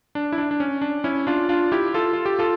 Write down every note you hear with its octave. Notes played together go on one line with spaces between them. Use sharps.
D4
E4
D4
D4
C#4
D4
C#4 E4
D4 F4
D4 F4
E4 G4
F4 A4
F4
G4
F4 A4